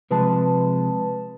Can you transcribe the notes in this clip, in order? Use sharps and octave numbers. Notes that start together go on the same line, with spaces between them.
C3 F3 G#3 B4 A5